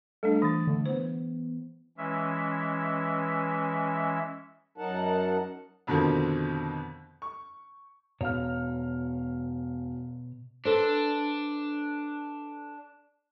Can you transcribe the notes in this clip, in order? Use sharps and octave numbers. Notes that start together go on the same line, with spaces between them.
G3 A3 D4 A4
E3 D#6 A6
D3 A3
E3 B3 C5
E3 G#3 C#4 E5
F#2 F#3 D#4 A#4 F#5 A5
F2 B2 D3 D#3 F3
C#6
E1 B2 C#5 F5 A#5 F6
D4 A4 B4 C5